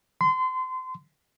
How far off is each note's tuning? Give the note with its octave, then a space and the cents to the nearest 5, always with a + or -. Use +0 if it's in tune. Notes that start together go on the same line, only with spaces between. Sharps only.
C6 -30